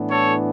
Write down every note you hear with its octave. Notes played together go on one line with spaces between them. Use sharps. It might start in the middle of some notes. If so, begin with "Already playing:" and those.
Already playing: A2 E3 B3 D4
A4 C#5